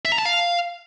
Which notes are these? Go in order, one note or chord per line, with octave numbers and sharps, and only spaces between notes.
E5
A#5
A5
F5